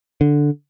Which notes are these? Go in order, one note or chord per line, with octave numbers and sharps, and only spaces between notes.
D3